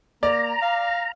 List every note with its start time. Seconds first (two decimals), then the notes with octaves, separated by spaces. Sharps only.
0.23 A#3 D5 A#5
0.62 F5